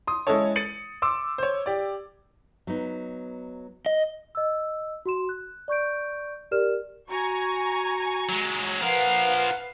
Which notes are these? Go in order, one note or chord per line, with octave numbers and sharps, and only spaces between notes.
C6 D#6
G#3 C#4 E4 A4 C#5
A6 C#7 D#7 F#7
C6 D6 E6
C5 C#5
G4 D5
F#3 B3 D#4
D#5
D#5 E6
F#4 C6 E7
F#6
D5 C#6 G6 D7
G4 A#4 D5 F6 E7
F#4 G#5 A#5 C#6
F#3 G#3
F3 A#4 B4 F5 F#5